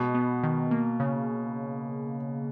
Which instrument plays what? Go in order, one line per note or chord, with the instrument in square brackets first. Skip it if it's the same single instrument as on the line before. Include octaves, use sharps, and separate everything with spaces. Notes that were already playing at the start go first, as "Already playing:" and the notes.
Already playing: [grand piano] B2 [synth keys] G#3
[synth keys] B3
D#3
A#3
C#3